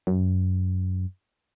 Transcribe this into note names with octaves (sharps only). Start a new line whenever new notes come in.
F#2